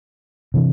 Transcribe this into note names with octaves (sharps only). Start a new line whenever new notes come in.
C3 E3